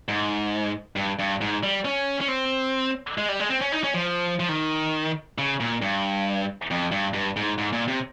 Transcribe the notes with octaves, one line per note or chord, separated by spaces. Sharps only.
G#2
G2
G2
G#2
G3
C#4
C#4
C4
G#3
G3
G#3
C4
C#4
D#4
C#4
F3
F3
D#3
C#3
A#2
G2
F2
G2
G2
G#2
G#2
A#2
C3